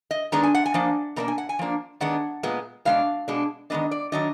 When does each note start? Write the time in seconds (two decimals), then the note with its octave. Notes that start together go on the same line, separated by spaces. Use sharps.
0.11 D#5
0.32 D#3 G#3 B3 D4 A#5
0.43 G#5
0.54 F#5
0.65 G#5
0.74 F3 A#3 D4
1.16 B2 A#3 D4 A#5
1.28 G#5
1.38 F#5
1.49 G#5
1.59 F3 A#3 D4
2.00 D#3 G#3 B3 D4 F#5
2.43 A#2 G#3 B3
2.85 B2 G#3 D4 F5
3.28 B2 G#3 D4
3.70 D#3 G#3 B3 D4 D#5
3.91 D5
4.12 D#3 F#3 D4 D#5